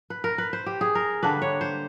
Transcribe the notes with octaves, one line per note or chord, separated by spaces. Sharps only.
B4
A#4
B4
C5
G4
G#4
A#4
D3 G3 A#3 D4 B4
C#5
C5